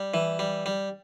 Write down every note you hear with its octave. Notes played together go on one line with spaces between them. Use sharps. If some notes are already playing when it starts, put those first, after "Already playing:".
Already playing: G3
E3
G3
G3